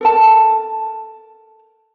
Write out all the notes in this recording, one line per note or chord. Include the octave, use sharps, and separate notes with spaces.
A4 A#4 A5